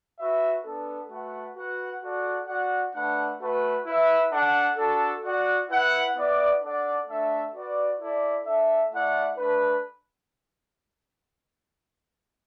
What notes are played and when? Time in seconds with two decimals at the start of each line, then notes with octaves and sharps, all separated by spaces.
0.18 F#4 B4 E5
0.64 B3 D4 A4
1.10 A3 F#4 B4 F#5
1.56 F#4 B4 F#5
2.02 F#4 A4 D5 F#5
2.48 F#4 D5 F#5
2.95 A3 D4 B4 F#5
3.40 A3 F#4 B4
3.86 E4 B4 E5
4.32 D4 A4 F#5
4.78 D4 F#4 A4
5.24 F#4 D5 F#5
5.70 E4 B4 F#5
6.16 B3 E4 D5 F#5
6.62 D4 A4 D5 F#5
7.08 A3 D4 A4 E5
7.54 F#4 B4 D5 F#5
8.00 E4 A4 D5
8.46 D4 A4 E5
8.92 A3 E4 D5 F#5
9.38 A3 D4 B4